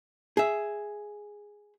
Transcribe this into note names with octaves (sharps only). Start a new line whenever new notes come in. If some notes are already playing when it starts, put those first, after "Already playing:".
G#4 E5